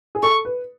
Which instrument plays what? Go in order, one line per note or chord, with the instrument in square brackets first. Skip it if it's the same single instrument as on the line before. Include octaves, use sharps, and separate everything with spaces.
[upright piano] G#4
[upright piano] A4 [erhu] C#6
[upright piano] B4